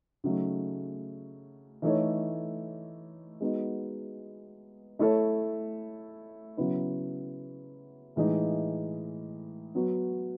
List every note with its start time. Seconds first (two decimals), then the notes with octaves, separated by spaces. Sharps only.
0.24 C#3 F#3 A3 D#4
1.82 E3 A3 D#4 A4 C#5
3.41 G#3 B3 D#4 F#4
4.99 A3 E4 A4 C#5
6.57 C#3 F#3 B3 E4 B4
8.16 A2 E3 G#3 D#4
9.75 F#3 B3 F#4